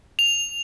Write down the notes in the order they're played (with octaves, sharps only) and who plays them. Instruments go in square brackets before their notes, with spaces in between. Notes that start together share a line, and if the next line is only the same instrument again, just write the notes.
[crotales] F7